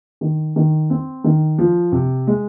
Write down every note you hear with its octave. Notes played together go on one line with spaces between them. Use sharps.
D#3
D#3
C4
D#3
F3
C3
G#3